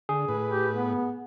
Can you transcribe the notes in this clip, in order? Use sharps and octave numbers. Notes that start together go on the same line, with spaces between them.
D3 G#4
A2 B4
G4
B3